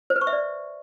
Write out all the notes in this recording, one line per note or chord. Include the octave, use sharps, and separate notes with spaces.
C5
B4
C#6
E5
D5